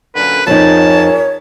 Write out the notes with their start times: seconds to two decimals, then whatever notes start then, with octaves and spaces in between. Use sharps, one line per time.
0.15 F#2 A#2 D3 B4
0.47 F2 F3 D#4 G#4 A#4 C#5 A5